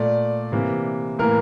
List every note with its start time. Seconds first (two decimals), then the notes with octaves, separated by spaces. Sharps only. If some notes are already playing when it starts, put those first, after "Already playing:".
Already playing: A#2 A3 D5
0.52 C3 E3 A#3
1.19 A2 E3 A#3 A#4